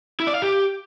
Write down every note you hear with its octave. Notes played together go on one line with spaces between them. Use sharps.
E4
D5
F5
G4